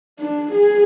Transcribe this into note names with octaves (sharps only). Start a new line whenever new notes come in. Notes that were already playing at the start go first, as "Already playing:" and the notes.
D4
G#4